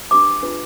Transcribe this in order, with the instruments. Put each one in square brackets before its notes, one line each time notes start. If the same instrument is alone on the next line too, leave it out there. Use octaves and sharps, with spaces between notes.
[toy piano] D4 G4 B4 D6
D4 F4 G#4 B4